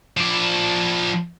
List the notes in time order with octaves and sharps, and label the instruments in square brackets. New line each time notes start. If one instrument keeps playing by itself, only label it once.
[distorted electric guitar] F3 D5